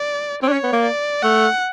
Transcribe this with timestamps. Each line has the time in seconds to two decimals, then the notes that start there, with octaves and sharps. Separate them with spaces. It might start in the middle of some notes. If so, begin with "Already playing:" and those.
Already playing: D5
0.43 C4 C#5
0.48 D4
0.53 C#4
0.63 B3
0.73 A#3
0.83 D5
1.22 A3 F#5